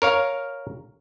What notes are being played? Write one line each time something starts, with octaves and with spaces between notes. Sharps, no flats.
A#4 C#5 F5